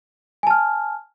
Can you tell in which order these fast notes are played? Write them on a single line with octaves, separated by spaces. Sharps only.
G#5 A5 F6